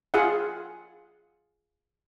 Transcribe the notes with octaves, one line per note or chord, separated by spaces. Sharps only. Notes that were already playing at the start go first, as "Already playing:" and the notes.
F4 G#4 F5 F#5